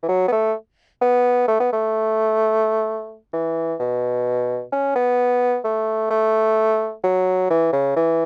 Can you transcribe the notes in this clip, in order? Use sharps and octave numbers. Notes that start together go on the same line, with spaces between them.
E3
F#3
B3
A3
B3
A3
B3
A3
E3
B2
C#4
B3
A3
A3
F#3
E3
C#3
E3